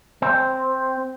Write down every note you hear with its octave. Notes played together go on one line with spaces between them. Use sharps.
C4